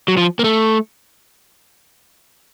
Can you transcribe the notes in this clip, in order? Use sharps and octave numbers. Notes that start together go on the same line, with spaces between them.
F#3
F3
A#3
A3